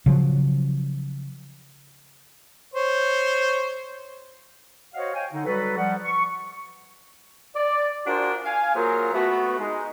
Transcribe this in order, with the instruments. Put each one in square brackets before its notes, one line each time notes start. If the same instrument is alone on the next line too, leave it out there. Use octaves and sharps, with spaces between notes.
[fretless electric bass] C#3 F3 F#3
[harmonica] C5 C#5
[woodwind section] F#4 C5 C#5 D#5 F5 F#5
C#5 F5 G5 G#5
D3 D#4
F#3 G3 F#4 A4 B4
F3 G3 F#5
C#6
[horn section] D5
D4 F4 F#4 G#4 A#4 C5
F5 G#5
F#3 A#3 F4 G#4 A#4 C5
A3 B3 F#4
G#3 D#4